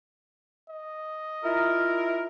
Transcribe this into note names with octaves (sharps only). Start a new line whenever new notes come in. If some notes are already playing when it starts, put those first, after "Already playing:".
D#5
E4 F4 A#4